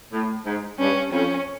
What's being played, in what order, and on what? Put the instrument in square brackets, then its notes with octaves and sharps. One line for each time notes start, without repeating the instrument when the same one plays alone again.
[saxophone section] A2
G#2
[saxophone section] G2 [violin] C#4
[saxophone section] F2 [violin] C#4